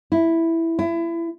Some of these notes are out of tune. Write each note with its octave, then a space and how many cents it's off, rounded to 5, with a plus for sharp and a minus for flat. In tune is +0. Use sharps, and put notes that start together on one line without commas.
E4 +0
E4 +25